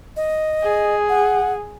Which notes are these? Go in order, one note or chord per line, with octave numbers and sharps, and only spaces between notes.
D#5
G#4
F#5